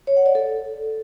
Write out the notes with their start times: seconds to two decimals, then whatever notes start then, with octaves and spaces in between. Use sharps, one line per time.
0.07 C#5
0.17 F#5
0.26 D5
0.35 A4